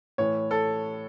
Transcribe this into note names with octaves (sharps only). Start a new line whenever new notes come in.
A2 E3 C#5
A4